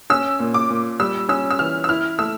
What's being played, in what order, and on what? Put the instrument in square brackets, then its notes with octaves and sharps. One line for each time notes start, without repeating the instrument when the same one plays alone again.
[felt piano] C#4 [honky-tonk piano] E6
[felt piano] A#2
[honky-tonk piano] D6
[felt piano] A#2
[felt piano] G3 [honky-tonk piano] E6
[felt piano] C#4 [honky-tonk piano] E6
[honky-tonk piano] E6
[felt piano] E3 [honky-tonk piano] F6
[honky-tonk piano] E6
[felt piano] E4 [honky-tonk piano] F6
[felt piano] A3 [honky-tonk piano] E6